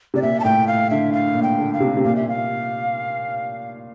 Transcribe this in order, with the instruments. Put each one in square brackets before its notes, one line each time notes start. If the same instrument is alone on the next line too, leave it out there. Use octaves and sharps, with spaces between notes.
[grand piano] C3 [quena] D5
[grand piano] A#2 [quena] E5
[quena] A5
[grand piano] A2 [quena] G5
[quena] F5
[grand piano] D3 [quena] E5
[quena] F5
[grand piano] A#2
[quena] G5
[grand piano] D3
[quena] F5
[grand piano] C3
C3
[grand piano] A#2 [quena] F5
[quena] E5
F5